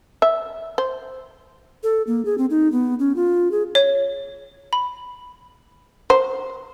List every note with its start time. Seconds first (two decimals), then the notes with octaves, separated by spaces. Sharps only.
0.22 E5
0.78 C5
1.83 A4
2.07 A#3
2.25 G#4
2.38 C4
2.50 D#4
2.72 B3
2.99 C#4
3.16 F4
3.51 G#4
3.75 C#5
4.73 B5
6.10 C5